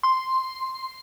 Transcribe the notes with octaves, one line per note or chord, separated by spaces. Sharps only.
C6